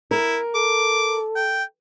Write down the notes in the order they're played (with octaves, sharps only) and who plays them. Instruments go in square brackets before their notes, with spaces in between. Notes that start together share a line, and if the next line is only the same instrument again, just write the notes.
[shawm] E4 [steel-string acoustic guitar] A#4
[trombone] A4 [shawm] D6
[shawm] G5